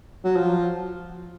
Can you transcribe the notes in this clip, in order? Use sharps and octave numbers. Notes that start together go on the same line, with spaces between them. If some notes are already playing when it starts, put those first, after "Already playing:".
F#3
F3